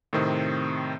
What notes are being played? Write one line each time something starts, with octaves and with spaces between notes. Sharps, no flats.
A2 C3 D#3 C4